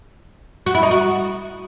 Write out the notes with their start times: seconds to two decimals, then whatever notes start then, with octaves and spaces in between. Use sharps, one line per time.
0.66 F#4
0.75 E4
0.83 D#4
0.91 F#4